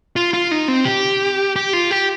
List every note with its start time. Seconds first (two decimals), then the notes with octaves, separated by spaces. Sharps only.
0.16 F4
0.34 F4
0.51 D#4
0.68 C4
0.85 G4
1.56 G4
1.73 F4
1.91 G4